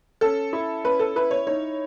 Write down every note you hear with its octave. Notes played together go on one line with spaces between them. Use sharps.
C#4 A4
E4
C#4 B4
A4
E4 B4
C#5
D#4 C#5